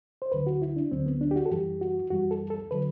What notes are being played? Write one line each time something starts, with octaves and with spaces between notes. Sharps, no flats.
C5
D2 D3 F#3 B4
F#4
E4
D4
D2 D3 F#3 C4
B3
D4
G4
F#4
A4
F#2 E3 G3 G4
F#4
F#2 E3 G3 F#4
A4
A4
D3 F#3 B4